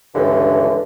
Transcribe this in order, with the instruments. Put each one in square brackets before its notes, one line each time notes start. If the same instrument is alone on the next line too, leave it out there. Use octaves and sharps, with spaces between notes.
[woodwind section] C#2 G2 D3 E3